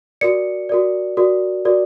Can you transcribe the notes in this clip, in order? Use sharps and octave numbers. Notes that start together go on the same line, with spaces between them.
F#4 A#4 D5 C#7
F#4 A#4 D5
F#4 A#4 D5
F#4 A#4 D5